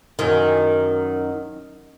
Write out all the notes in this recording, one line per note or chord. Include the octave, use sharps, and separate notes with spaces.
F#2 D#3